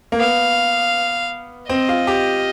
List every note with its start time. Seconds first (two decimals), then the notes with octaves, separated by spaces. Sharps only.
0.12 A#3
0.20 B3 F5
1.69 C4 D#5
1.89 F4
2.07 G4